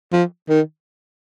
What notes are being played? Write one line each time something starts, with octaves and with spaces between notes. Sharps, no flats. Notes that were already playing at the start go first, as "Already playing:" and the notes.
F3
D#3